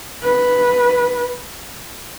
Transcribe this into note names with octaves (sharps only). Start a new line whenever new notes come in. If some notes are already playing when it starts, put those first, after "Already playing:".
B4